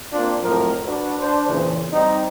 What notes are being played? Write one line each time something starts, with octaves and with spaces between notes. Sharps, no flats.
A#3 C4 D4 F4
F2 A2 F3 F#3 A#4
D4 F#4 B4
D4 C5
E2 A#2 C#3 E3
G3 C4 D#4